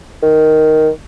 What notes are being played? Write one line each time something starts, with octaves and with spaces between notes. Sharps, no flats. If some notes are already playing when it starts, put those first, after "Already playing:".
D#3